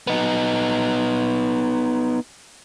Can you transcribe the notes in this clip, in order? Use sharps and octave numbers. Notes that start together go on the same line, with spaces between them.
B3 D#4